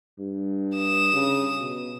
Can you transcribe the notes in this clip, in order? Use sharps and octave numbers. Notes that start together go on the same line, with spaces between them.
G2
D#6 E7
C#3
B2